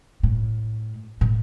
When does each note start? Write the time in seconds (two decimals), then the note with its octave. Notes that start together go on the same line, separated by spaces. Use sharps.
0.23 A2
1.21 A2